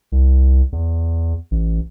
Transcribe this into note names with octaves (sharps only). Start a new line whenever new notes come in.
C2
E2
A1